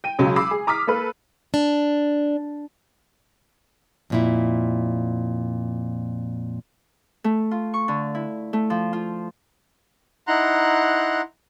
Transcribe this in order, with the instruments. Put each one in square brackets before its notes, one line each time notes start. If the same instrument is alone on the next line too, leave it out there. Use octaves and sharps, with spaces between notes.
[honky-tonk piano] G5 D#7
C#2 C#3 F#3
B5 D6 E6 C7
G#4
A#5 D6 D#6 F6 B6
A#3 A4 B4
[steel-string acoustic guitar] D4
[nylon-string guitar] F2 A#2 E4
[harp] A3
F4
C#6
D3
E4
A3
F3
F4
[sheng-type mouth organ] D#4 E4 F#5 A#5 C6 F#6